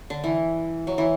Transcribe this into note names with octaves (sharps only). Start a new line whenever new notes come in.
D3
E3
F#3
E3